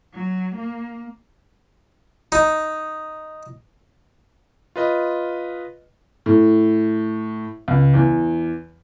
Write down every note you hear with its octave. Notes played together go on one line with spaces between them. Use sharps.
F#3
A#3
D#4
F4 B4 D#5
A2
C#2
E2